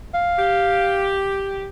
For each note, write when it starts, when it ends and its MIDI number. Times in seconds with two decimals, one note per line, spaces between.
0.14 1.18 77
0.38 1.68 67